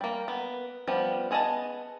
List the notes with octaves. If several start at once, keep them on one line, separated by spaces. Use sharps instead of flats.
G3 A#3
B3
F3 G3 B3
B3 G#4 D#5 E5 A5